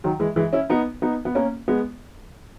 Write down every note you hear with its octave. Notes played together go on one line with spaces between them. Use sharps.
D#3 F#3
E3 G#3
E3 G#3
C#4 E4
B3 D#4
B3 D#4
B3
A#3 C#4
G#3 B3